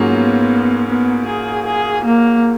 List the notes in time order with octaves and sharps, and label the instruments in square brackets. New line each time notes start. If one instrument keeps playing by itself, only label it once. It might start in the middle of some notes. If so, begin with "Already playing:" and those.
Already playing: [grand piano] G#2 F#3 A#3 C#4 F4
[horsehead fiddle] B3
B3
G#4
G#4
A#3